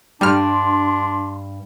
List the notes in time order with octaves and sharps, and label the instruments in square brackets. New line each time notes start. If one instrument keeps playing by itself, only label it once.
[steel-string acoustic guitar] G2 [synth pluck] G3 F6 [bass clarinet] D4 [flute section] C6